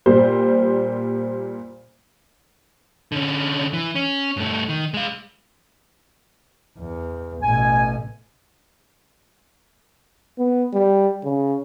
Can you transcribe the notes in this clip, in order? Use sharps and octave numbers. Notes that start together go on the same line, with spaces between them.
A#2 G3 C5
D3 C#4
E3
C#4
G2 A3
D#3
G#3 F5
E2
A1 B2 G#5
B3
G3
C#3